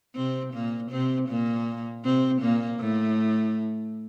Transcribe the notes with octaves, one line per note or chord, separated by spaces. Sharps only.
C3 C4
A#2 A#3
C3 C4
A#2 A#3
C3 C4
A#2 A#3
A2 A3